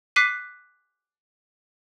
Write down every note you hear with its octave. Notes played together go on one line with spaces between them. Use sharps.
D6 F#6 B6 C7 D#7